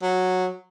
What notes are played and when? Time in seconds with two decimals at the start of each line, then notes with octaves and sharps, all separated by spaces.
0.02 F#3